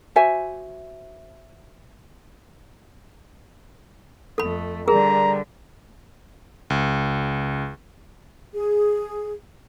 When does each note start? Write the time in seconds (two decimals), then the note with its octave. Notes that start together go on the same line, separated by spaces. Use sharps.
0.16 F#4 C5 E5 G#5
4.38 F2 A3 A4 B5
4.88 D3 G3 G#4 A#4 A#5
6.70 C#2
8.54 G#4